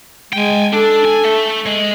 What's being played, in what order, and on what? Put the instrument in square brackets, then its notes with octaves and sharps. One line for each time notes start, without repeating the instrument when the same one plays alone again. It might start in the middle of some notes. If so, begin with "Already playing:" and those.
[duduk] G#3 [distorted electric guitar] G5 G#5
[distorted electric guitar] D4 [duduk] A4
[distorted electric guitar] G#5
A3
G#3